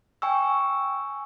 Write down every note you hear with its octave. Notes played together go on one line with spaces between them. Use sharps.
G5 G#5 C#6 E6